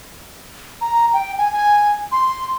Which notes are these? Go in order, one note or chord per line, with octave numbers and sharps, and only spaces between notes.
A#5
G5
G#5
G#5
C6